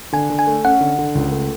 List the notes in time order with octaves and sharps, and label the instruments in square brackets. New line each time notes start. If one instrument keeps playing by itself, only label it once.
[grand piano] D3 [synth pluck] G#5
[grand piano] D3
[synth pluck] G#5
[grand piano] A3
[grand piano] C#4 [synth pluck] F#5
[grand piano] D3
D3
C#2
A3